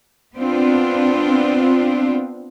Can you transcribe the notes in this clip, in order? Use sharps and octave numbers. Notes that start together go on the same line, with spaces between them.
B3 C4 D4 F4